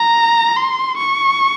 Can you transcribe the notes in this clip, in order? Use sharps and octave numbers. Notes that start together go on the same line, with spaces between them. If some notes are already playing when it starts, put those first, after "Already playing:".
Already playing: A#5
C6
C#6